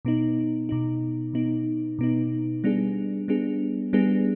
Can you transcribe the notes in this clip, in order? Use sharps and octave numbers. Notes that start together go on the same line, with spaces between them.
B2 B3 D#4
B2 B3 D#4
B2 B3 D#4
B2 B3 D#4
G3 B3 D4 G#4
G3 B3 D4 G#4
G3 B3 D4 G#4